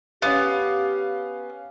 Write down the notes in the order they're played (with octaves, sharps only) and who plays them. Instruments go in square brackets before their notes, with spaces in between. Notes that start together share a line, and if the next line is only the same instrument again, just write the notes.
[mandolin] B3 [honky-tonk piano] C#4 F5 [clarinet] G4